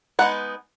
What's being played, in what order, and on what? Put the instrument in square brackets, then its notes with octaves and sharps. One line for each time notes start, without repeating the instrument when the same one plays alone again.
[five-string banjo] G#3 B3 D#4 F#5